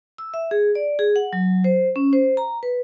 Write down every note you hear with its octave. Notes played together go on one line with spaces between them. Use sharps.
E6
E5
G#4
D5
G#4
F#5
F#3
C5
C#4
C5
A#5
B4